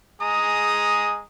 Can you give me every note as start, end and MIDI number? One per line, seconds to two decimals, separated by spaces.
0.21 1.23 56
0.21 1.23 68
0.21 1.23 82
0.21 1.23 87